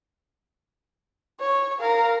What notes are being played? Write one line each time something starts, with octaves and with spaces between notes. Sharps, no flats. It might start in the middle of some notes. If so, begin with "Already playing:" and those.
C#5
A#4 F5